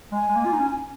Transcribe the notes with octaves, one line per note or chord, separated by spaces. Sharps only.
G#3 G#5
G#3
A#3
F4
D#4
C#4